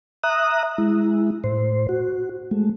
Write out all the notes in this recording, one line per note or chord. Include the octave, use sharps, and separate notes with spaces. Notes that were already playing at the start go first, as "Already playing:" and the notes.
E5 A#5 D#6 F#6
G#3 E4
A2 C5
F#4
G#3 A3